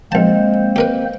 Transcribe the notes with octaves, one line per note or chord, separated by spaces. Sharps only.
A#1 G#3 A#3 C4 C5 A5
G4 A#4 B4